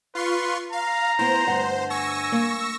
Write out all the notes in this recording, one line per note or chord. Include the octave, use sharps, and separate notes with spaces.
F4 B4 C6 C#6
F5 A#5
B3 E4 C5
D2 G2 F#5
G#5 C#6 E6 A#6
A#3